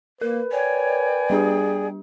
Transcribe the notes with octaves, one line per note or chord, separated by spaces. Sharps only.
A#3 A#4 B4
C#5 D5 G5 G#5
G3 D4 G4 G#4